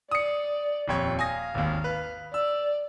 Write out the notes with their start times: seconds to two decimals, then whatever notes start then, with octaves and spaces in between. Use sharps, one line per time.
0.11 D5 D#6 C#7
0.88 D#1 F2 C#5
1.19 F5 G#5 D#6 A#6
1.55 G#1 D#2
1.84 B4
2.34 D5 E6